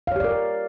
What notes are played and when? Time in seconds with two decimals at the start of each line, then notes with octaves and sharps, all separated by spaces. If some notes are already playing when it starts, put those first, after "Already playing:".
0.07 F5
0.12 C#5
0.16 G4
0.20 D5
0.24 A#4